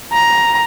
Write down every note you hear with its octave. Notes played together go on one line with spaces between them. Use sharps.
A#5